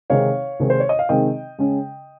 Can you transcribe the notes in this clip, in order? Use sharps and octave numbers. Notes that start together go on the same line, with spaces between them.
C3 D#3 G#3 C4 D#4 C#5 F5
C3 D#3 G#3 C4 D#4
C5
C#5
D#5
F5
C3 D#3 G#3 C4 D#4 D#5 G5
C#3 G#3 C#4